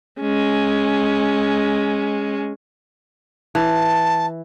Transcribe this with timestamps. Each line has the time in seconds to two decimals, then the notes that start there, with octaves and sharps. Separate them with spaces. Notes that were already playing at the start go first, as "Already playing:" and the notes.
0.20 G#3 C#4
3.55 E3 A5